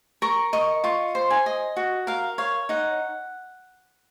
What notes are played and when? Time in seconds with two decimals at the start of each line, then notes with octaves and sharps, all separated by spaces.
0.22 A#4 C#6
0.53 D#5 C#6
0.84 F4 C#6
1.15 C5
1.30 G#5
1.46 D#5
1.77 F#4
2.07 A#4 F5
2.38 C#5 F5
2.69 D#4 F#5